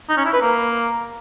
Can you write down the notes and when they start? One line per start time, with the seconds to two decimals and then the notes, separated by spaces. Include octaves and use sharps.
0.09 D#4
0.17 C#4
0.25 E4
0.33 B4
0.41 A#3